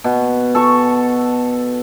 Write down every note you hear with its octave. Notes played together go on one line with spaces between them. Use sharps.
B2
A4 C#6